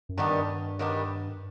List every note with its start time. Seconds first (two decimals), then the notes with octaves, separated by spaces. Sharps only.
0.09 F#2
0.18 G2 D#3 G3 B3 D4
0.79 D#3 G3 B3 D4